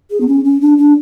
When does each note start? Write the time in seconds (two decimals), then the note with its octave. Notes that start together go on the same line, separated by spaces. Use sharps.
0.11 G#4
0.21 B3
0.27 C#4
0.45 C#4
0.61 D4
0.78 D4